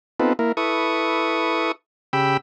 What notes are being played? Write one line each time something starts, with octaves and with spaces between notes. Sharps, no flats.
B3 C4 D#4 F4 A4 B4
A#3 E4 A#4
E4 A4 B4 C#6 D#6
C#3 G4 G5 B5 E6